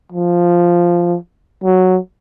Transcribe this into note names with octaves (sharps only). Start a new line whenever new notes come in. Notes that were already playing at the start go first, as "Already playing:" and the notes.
F3
F#3